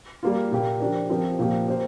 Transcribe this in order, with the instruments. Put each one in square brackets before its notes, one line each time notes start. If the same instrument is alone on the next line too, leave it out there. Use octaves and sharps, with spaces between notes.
[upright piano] G3 A#3 F4
A#2 A#3 G4
F3 D4 G4 A#4
F3 C4 G4 A#4
A#2 F3 A#3 G4
A#3 G4 C5